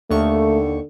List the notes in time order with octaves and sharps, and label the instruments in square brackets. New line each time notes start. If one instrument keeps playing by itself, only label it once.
[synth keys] D#2 C#6 [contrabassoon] D3 [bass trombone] A3